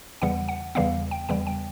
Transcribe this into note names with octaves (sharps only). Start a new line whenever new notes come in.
E2 C#3 E3 G3 B3 F#5
F#5
E2 C#3 E3 G3 B3 F5
G5
E2 C#3 E3 G3 B3 G5
G5